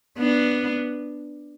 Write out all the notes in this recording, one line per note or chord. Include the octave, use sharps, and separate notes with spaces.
B3 D4